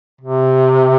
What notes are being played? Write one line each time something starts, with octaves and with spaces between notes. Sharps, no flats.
C3